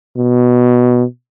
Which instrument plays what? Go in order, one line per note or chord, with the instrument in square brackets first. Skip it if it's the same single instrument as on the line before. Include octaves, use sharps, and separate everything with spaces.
[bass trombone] B2